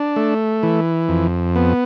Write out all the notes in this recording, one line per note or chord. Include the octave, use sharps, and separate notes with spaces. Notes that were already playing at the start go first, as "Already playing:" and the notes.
Already playing: D4
A3
E3
F2
B3